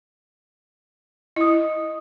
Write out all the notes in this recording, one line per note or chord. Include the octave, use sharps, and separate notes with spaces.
E4 D#5 D#6